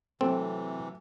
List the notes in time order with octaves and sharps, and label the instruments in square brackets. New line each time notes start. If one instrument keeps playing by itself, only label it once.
[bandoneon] C3 E3 [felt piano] F#3 A3 A4 [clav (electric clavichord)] C4